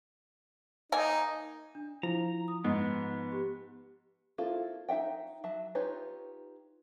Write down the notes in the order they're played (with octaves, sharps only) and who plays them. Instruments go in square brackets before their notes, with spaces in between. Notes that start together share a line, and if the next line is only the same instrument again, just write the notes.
[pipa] A#3 G#5 [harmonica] D#4
[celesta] D4
[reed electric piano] F3 [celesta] E4 [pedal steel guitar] A#5
[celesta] D#6
[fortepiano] G#2 [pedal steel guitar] B3 [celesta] D#5
[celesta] G4
[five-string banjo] A#3 C4 E4 F4 A4
D#4 E5 F#5 G5
F#3 E5 A5
D#4 F4 G4 B4 C#5